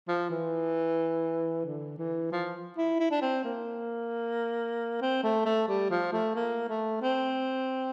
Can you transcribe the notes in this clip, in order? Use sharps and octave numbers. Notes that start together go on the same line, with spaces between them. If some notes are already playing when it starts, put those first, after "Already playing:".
F3
E3
D3
E3
F3
E4
E4
D4
C4
A#3
C4
A3
A3
G3
F3
A3
A#3
A3
C4